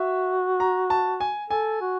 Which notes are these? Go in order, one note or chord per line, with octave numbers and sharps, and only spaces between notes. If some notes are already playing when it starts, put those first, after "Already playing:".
Already playing: F#4 E5
A#5
A5
G#5
A4 G#5
F#4